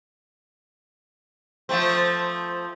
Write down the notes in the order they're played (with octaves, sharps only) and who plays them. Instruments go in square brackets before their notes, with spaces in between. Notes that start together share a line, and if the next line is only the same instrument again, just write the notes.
[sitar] F3 A3 C4